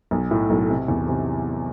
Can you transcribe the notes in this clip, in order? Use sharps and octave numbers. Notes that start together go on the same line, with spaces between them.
B1
A2
B1
C3
E2
C3